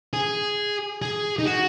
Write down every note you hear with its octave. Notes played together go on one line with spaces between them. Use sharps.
G#4
G#4
D#4
F#4